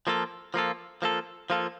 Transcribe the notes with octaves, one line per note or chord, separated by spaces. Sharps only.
F3 A#3 F4 A4
F3 A#3 F4 A4
F3 A#3 F4 A4
F3 A#3 F4 A4